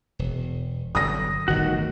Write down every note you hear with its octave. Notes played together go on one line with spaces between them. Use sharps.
E1
G1 D3 F#3 D#6 A#6
D1 G1 A#2 D#3 F#4